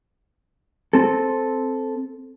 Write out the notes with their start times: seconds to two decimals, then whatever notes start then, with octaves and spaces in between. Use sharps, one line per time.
0.93 C4 A4